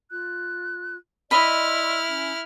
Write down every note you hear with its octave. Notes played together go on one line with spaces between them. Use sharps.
F4 F#6
E4 D5 D#5 B5 C6 E6 F6
C#4